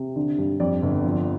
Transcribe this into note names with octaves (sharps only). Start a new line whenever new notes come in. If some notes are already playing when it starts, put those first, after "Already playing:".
Already playing: C3
D3
G2
F2 D5
G1
F3